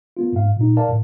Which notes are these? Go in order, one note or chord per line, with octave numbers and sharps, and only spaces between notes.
A#3 B3 F4
G#2 F5
A#2 D#4
A#4 D5 F5 A5
A2